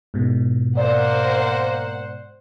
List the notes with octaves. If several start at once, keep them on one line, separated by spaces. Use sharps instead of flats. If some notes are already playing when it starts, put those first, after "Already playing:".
G#2 B2
A#3 C5 D5 F#5